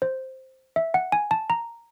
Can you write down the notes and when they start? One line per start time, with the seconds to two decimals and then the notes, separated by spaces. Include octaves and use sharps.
0.02 C5
0.76 E5
0.94 F#5
1.12 G#5
1.31 A5
1.50 A#5